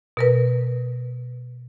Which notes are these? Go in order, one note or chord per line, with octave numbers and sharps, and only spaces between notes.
B2 A#4 B4